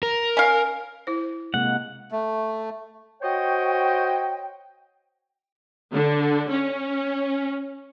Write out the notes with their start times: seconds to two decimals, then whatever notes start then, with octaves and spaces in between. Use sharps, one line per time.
0.03 A#4
0.37 C#4 F5
1.07 E4 C5
1.54 C3 G#3 A#3 F#5
2.11 A3
3.22 F#4 C5 C#5 D#5 G5
5.93 D3
6.49 C#4